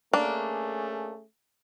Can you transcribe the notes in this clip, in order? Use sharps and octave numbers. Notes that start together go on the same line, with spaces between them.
A3 A#3 C#4 D4 G#4